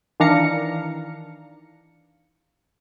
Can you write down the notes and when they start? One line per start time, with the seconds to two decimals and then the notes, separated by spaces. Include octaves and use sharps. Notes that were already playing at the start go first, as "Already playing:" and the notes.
0.20 D#3 E3 D4 F5 A#5 C#7